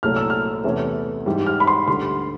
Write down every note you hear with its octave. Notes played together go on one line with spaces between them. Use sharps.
C2 A#2 F#3 A3 F6
E6
F6
E2 C3 E3 A3 C#4
G#2 E3 G3
F6
B5
C6
D2 D3 G3 C6